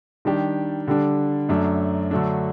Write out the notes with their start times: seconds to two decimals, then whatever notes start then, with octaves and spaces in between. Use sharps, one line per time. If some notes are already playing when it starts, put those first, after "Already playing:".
0.25 D#3 G3 D4 G4
0.88 D3 G3 D4
1.49 F#2 F#3 A3 D4
2.11 D3 F#3 A3 D4